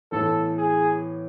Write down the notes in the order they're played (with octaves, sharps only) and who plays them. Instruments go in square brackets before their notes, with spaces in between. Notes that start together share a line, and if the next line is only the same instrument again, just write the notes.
[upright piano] A2 E3 B3 [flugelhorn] A4
[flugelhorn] G#4